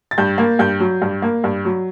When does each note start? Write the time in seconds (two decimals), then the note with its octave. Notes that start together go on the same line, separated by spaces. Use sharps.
0.11 A6
0.18 G2 G6
0.38 A#3
0.59 G2 G6
0.80 F#3
1.02 G2
1.22 A#3
1.44 G2
1.65 F#3